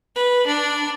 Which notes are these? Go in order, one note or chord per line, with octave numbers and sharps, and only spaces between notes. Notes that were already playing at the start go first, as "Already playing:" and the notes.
B4
D4